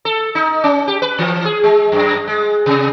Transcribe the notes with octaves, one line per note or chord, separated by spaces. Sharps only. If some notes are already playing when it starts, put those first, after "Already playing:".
A4
D#4
C#4
G4
B4
E3
G#4
G#3
F#2
G#3
C3